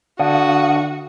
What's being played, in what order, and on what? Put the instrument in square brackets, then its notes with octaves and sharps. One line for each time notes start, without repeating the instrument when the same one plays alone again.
[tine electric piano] D3 D4 [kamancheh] F#4 [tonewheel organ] F5 F#5 D#6